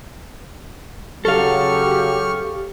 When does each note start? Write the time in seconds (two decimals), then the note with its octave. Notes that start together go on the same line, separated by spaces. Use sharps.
1.25 C#3 F#3 G4 A4 F5 C#6 F6